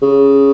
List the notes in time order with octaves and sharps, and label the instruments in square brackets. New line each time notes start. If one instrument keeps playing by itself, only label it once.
[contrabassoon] C#3